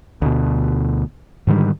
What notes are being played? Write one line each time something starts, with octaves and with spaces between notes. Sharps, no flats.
D2 B2
G#2 D3 D#3 G3